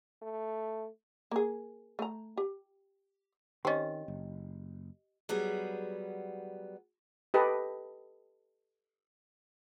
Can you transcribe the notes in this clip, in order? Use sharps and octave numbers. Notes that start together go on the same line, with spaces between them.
A3
A#3 G#4
A3 A#5
G4
D#3 C4 C#4 G4 D#5
F#1
F#3 G3 B3 G#4
G4 A4 B4 D#5